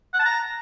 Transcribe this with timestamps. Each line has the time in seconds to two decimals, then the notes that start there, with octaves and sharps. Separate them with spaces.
0.13 F#5
0.19 A5
0.25 A#5